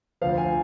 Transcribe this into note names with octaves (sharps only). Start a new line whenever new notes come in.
D2 D3 F3 F5
G#5